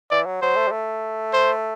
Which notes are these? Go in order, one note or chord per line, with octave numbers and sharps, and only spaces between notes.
E3 D5
F#3
F#3 C5
A3
G3
A3
C5